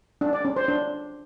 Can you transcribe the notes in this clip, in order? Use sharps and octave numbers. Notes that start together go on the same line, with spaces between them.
D4
D5
C#4
C5
D4